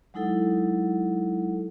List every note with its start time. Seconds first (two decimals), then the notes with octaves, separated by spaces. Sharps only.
0.14 F#3 G#3 D#4 E4 A4 F#5